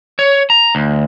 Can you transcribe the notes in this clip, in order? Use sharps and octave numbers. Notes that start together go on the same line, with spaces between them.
C#5
A#5
D2